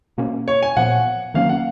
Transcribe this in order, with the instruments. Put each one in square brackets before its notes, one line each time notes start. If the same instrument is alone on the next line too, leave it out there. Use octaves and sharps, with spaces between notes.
[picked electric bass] B2 A#3 C#4
[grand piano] C#5
G#5
[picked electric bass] A#2 F3 B3 [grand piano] F#5
[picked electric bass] D#3 F#3 A#3 C#4 [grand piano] F5
[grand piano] F#5